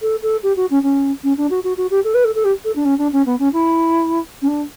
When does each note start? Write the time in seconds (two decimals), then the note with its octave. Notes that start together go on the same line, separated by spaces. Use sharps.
0.02 A4
0.23 A4
0.43 G4
0.57 F#4
0.71 C#4
0.83 C#4
1.24 C#4
1.37 D4
1.50 F#4
1.64 F#4
1.77 F#4
1.91 G4
2.04 A4
2.15 B4
2.25 A4
2.36 A4
2.45 G4
2.65 A4
2.76 D4
2.85 C#4
2.98 D4
3.13 C#4
3.26 B3
3.39 C#4
3.53 E4
4.42 C#4
4.48 D4